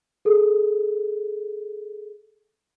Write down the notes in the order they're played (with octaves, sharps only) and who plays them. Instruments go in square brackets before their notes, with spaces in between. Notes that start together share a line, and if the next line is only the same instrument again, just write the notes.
[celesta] G#4 A4